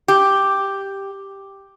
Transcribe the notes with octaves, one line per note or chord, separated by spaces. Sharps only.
G4